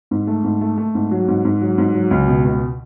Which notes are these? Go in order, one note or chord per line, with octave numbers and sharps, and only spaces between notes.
G#2
A3
G#2
A3
A3
G#2
F#3
G#2
G#2
F#3
G#2
F#3
C#2
B2
C#2